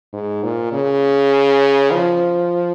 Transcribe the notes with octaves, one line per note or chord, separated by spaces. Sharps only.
G#2
A#2
C#3
F3